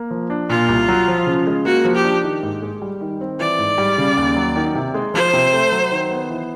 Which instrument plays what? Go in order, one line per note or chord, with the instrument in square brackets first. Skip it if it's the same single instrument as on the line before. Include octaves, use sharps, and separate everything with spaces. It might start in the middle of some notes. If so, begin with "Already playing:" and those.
Already playing: [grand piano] A#3
F3
D4
[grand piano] A#2 [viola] F4
[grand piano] C2
F#3
F3
C#3
G#3
[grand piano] A#3 [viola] F#4
[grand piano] F3
[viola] G4
[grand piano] D4
D#3
G#2
G#3
G3
D#3
C4
[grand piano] E3 [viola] D5
[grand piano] G#2
G3
C#3
D#2
F#3
D#3
C3
G#3
[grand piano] F3 [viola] C5
[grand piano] C3
A3
F#3
D#3
B3
E3